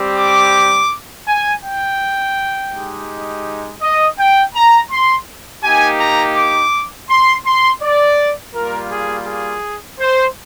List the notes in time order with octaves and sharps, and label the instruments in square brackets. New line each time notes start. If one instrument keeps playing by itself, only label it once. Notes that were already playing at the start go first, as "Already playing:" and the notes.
Already playing: [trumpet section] G3 C4 G4
D6
G#5
G5
G#3 D#4 G4
D#5
G5
A#5
C6
A#3 D#4 G4 G#5
A#5
D6
C6
C6
D5
G3 A#3 F4 A#4
G#4
G#4
C5